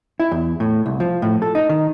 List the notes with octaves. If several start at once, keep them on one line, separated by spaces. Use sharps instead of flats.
E4
E2
A2
C2
F3
A2
A4
D#4
D#3